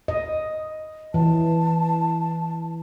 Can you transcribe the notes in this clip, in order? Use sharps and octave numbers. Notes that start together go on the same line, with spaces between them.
D#5
E3 A5